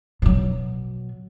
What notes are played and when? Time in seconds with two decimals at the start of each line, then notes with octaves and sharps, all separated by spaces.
0.22 B2 F#3